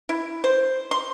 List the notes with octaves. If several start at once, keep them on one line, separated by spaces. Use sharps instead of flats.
E4
C5
C6